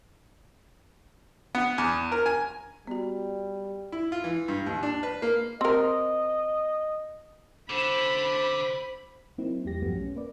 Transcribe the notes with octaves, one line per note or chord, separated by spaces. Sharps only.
B3
E2
A#4
G#5
G3 B3 F#4
E4
F4
E3
G2
D#2
D4
B4
A#3
C4 A#4 D#5
D3 C5 B5
F#3 A#3 C4 D#4 E4
E2 G3 G4 A#6
B1 G2 F3 F#3 A3 B3
C#4
A#3 B4 D5